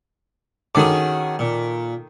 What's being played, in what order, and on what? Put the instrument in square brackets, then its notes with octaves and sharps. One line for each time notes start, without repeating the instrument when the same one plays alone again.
[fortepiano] D#3 A4 D6 [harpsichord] C#4 F#4 G#4
[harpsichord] A#2